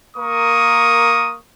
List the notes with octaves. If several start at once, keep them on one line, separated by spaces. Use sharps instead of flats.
A#3 A#4 C#6 D#6